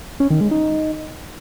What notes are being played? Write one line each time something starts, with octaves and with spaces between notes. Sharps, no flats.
C#4
D#3
G#3
D#4